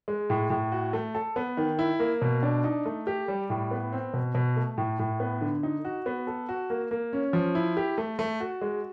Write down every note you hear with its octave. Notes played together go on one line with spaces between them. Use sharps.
G#3
A2
A2
F#4
A3
A4
B3
D#3
E4
A#3
B2
D4
D#4
A3
G4
G3
A2
B3
C4
B2
B2
A3
A2
A2
B3
D3
D#4
F#4
B3
A4
F#4
A#3
A#3
C#4
F3
E4
G4
A3
A3
F#4
G#3